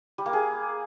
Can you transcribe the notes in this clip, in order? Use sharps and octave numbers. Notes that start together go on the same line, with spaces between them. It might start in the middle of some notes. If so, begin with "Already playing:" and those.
G3
A#3
G#4